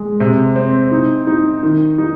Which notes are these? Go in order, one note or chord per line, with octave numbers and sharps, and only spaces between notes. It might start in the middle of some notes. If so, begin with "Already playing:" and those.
Already playing: G#3
C3
C4
D#4
D#4
D#3
D#4